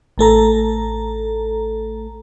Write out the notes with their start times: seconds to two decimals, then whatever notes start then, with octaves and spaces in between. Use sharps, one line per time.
0.18 A1 A3 A4 A#5